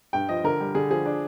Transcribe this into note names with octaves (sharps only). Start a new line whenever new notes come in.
G2 G5
F3 D#5
D3 A#4
G3
D3 G#4
F3 G#4
D4